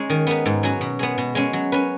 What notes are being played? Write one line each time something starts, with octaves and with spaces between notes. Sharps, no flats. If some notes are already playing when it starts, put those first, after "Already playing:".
Already playing: G#3 C#4 D#4
D#3
B3 D#4 B4
G#2
F#3 C#4 F#4
B2
G#3 B3
B2
G#3 C#4
F#3
C#4 B4